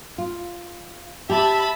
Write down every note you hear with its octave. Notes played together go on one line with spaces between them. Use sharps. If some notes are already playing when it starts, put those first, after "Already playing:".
F4
G4 E5 A5 B5